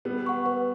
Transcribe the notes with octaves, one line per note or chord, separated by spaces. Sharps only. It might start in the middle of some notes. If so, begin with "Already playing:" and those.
G3 B3 B4
F#5 C#6
B4